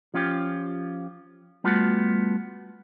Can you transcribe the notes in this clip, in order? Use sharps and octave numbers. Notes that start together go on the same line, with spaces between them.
F3 C#4 F4 G4
G3 A3 B3 F4 F#4